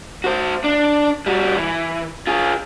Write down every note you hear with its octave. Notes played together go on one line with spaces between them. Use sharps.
F#4 C5
D4
G3 F#4
E3
F4 G#4